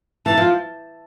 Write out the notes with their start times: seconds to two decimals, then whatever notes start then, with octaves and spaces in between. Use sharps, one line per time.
0.26 E3 A5
0.37 F3